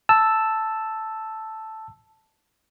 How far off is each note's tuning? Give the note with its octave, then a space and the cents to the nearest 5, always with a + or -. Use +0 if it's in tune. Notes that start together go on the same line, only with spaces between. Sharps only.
A5 +0 E6 +0